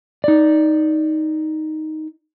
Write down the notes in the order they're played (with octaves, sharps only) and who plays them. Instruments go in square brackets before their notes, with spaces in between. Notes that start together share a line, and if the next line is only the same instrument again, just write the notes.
[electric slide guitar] D#4 D5